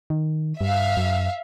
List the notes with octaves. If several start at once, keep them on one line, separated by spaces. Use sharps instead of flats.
D#3
G2 E5 F5
F#2